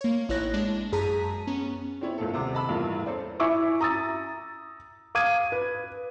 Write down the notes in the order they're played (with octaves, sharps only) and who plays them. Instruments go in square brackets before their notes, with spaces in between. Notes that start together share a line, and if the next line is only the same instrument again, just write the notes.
[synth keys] A#3 C#5
A1 D#4 E4 C#5 F#6 A#6
G#3 D4
F#2 G#4 A5 A#5 B6 D#7
B3 C#4
[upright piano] C4 C#4 E4 C#5 D5
F#1 C#2 A#2 A4
D#1 C3 C5 D6
D#5 A5 B5 E6
A1 E2 G2 A#3 E4 F4
C#4 A4 C5 D5
[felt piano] E4 E5 G#5 C#6 D6 E6
A#5 D#6 E6 A6
F5 D6 D#6 G#6 D#7
B4